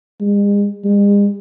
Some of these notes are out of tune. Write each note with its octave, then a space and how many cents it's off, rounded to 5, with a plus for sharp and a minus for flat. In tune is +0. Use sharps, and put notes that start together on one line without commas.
G#3 -40
G#3 -45